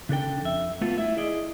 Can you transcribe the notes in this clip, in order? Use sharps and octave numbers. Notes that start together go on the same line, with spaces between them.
C#3 D4 A4 G5
F2 E5
A3 B3 F4
E4 E5
E4 G#4 D5 D#5